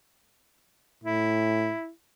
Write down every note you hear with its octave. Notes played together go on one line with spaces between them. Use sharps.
A2 E4